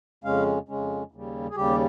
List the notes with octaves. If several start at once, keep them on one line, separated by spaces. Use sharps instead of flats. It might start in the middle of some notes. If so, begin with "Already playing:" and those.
F2 C#3 G#3 C#4 F5
F2 C#3 G#3 C#4
D#2 C#3 G3
G#4
D#2 C#3 G3 G4